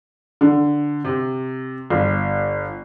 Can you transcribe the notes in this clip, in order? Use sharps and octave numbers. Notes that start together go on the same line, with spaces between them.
D3
C3
G1